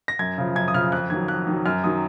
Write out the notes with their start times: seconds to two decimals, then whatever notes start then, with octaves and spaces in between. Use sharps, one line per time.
0.08 A#6
0.19 F#2 G#6
0.38 C#3 F3
0.56 F#2 G#6
0.68 D#6
0.74 C#3 F3 F6
0.92 F2 F#6
1.10 D#3 F#3 G#6
1.28 F2 F#6
1.47 D#3 F#3
1.66 F#2 F6
1.84 D#3 F#3 D#6